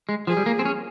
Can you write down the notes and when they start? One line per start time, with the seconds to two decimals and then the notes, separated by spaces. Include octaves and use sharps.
0.09 G#3
0.27 F3 G#4
0.37 G3
0.46 A#3
0.59 C4
0.65 C#4